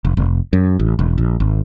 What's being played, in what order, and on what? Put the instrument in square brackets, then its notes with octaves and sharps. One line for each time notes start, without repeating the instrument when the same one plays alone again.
[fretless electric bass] F1
F1
F#2
A1
E1
A#1
G#1